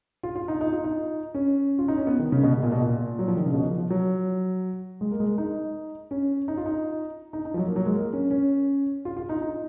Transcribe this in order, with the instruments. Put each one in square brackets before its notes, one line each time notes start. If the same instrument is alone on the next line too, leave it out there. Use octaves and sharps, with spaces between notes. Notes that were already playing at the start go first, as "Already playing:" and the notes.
[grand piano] F4
F4
D#4
D#4
F4
D#4
C#4
F4
D#4
C#4
B3
D#3
C#3
B2
B2
A#2
B2
A#2
F#3
F3
D#3
C#3
B2
F3
F3
F#3
G#3
A#3
G#3
D#4
C#4
D#4
F4
D#4
D#4
D#4
F3
F#3
A#3
F#3
G#3
A#3
C#4
C#4
F4
F4
D#4
D#4